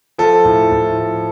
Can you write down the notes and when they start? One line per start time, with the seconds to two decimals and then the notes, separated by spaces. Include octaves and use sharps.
0.18 F3 A4
0.45 A2
0.71 A2
0.97 F3